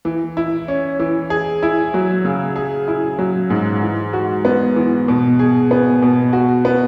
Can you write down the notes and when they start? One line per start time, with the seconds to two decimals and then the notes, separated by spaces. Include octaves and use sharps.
0.05 E3
0.37 E4
0.68 C#4
0.99 E3
1.30 G#4
1.63 E4
1.94 F#3
2.25 C#3
2.56 G#4
2.88 E4
3.19 F#3
3.50 G#2
3.82 E3
4.13 F#4
4.45 B3
4.76 E3
5.08 B2
5.39 G#4
5.71 B3
6.02 B2
6.33 F#4
6.65 B3